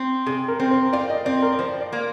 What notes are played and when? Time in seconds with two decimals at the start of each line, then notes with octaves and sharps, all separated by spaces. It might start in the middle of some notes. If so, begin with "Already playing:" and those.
Already playing: C4
0.26 C3 G#4
0.48 A#4
0.60 C4
0.71 C5
0.93 F4 D5
1.10 D#5
1.25 C4 D5
1.42 A#4
1.52 D5
1.59 F3 C5
1.81 D5
1.93 A#3